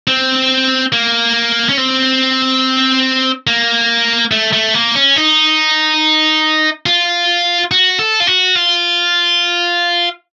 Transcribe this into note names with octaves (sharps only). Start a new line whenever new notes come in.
C4
A#3
C#4
C4
A#3
A3
A3
A#3
C#4
D#4
F4
F#4
A4
F4
F#4
F4